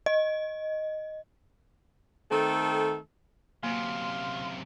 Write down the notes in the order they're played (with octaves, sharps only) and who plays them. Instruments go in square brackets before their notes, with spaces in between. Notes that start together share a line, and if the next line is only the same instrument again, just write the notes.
[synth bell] D#5
[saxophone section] D#3 A3 C4 A4
[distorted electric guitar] F#2 C3 [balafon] A#3 [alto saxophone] F5 [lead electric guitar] C6